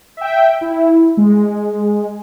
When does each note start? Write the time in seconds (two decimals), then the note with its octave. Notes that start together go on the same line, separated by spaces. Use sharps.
0.17 E5 G5
0.61 E4
1.17 G#3